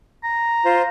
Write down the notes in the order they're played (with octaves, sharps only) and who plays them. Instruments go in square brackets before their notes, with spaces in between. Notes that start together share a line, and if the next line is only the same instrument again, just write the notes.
[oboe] A#5
[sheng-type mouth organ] F4 C5